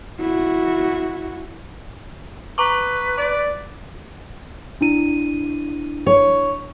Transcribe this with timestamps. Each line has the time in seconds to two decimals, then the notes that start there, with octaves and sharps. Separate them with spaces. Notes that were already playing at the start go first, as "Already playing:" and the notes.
0.21 E4 F#4
2.58 B4 A#5 C#6 D6
3.17 D5
4.81 D4 E4 D#7
6.06 C#5